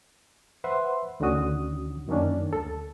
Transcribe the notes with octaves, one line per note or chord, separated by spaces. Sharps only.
B4 C5 E5 F#5 C6
D2 D3 D#3 C#4 F#4 D#6
F#2 D#3 A#3 C#4 D4
D2 A4